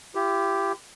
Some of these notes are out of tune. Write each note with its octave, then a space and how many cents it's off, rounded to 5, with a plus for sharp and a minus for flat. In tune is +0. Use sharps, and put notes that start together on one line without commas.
E4 +45 G4 +0